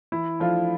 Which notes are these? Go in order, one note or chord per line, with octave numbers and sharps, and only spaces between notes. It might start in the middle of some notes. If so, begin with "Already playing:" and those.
E3 E4
F3 A3 D4 F4